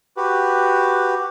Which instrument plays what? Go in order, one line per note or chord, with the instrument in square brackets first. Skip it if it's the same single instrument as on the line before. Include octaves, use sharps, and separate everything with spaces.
[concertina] F#4 G4 B4